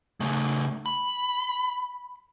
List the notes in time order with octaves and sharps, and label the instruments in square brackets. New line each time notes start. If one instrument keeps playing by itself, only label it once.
[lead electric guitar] C#3 A3
B5